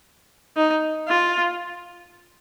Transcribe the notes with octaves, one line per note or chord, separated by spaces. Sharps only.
D#4
F4